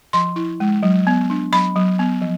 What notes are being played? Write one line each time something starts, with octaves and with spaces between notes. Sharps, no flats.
F3 C6
E4
G#3
F#3
B3
D4
F#3 B5
F#3
B3
F3